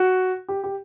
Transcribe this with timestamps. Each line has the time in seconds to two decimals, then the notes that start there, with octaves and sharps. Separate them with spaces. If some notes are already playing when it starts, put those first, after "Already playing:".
Already playing: F#4
0.49 G4
0.64 G4